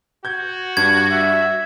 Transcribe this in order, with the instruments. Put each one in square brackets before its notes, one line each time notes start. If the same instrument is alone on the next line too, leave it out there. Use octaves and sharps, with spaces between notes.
[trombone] F#4 [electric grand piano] G6 G#6
[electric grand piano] G2 D4 [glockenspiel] G#6
[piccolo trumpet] E5